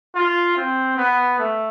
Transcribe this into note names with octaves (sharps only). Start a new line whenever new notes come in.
F4
C4
B3
A3